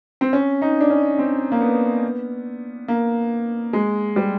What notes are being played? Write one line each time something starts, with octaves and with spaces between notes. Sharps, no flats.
C4
C#4
D#4
D4
C#4
C4
A#3
B3
A#3
G#3
G3